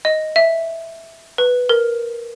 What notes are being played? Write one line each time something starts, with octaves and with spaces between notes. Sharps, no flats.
D#5
E5
B4
A#4